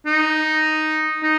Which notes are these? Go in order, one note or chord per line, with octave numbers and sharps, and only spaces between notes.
D#4
D#4